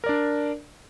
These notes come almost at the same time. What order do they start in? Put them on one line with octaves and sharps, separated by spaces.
A#4 D5 D4